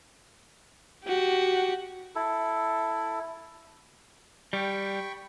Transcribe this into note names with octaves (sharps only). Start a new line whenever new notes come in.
F#4 G4
E4 A4
G3 G5 B5 C#6